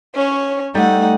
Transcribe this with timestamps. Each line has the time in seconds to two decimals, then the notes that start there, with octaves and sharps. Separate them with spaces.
0.15 C#4 C#5
0.75 G3 A3 D#4 F#5